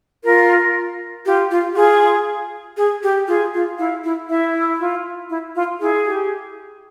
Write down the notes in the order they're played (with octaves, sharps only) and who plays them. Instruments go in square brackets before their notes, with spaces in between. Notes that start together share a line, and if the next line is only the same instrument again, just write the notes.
[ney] F4 [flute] A#4
[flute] F4 [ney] G4
[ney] F4
[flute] G4
[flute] F4 [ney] G#4
[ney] G#4
G4
[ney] F4 [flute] G#4
[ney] F4
[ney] E4 [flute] F5
[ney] E4
[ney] E4 [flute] E5
[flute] F4
E4
F4
[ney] E4 [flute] G#4
[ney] G4